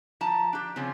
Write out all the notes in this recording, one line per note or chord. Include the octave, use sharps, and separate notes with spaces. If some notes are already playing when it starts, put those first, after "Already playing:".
F3 A5 A#5
D4 G4
C#3 F3 C4 C#4